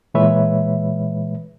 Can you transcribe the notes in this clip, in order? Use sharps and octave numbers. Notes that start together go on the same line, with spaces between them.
A#2 E3 G#3 B4 C#5 E5